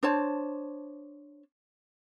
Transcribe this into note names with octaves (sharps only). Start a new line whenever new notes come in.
D4 C5 C#5 A5